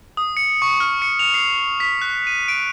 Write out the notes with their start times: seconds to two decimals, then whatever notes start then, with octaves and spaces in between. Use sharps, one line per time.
0.17 D#6
0.37 C#7
0.62 C#6
0.80 F6
1.02 C#7
1.19 F7
1.34 C7
1.80 B6
2.02 F#6
2.27 D#7
2.48 D7